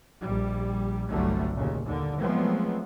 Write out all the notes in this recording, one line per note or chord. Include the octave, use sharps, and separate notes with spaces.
A#1 G3
G1 C2 D3 F#3 G3 A3
D#2 A#2 C#3
D#2 D3
F3 F#3 G#3 A3 B3 C4